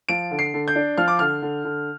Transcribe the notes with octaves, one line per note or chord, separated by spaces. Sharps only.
F3 D7
D3
C7
D3
G6
D4
F3 F6
D6
D3 F6
D3
D3